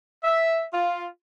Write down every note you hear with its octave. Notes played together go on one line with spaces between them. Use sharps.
E5
F4